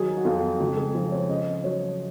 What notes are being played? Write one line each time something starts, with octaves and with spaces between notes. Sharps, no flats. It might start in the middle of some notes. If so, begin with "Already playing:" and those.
Already playing: D#3 F#3 G#4
F#4
F2 F4
C#2 F#4
G#4
F3 C5
C#5
C#3 D#5
F#3 C#5